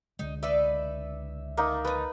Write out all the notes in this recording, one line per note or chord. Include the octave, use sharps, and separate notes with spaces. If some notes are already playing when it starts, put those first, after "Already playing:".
C#2 D3 G#3 D#4
D#4 B4 D5 E5
A3 A#3 D#4
F3 D#4 B4